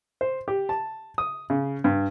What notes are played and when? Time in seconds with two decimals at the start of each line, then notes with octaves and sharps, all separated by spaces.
0.21 C5
0.48 G4
0.69 A5
1.18 D#6
1.50 C#3
1.84 G2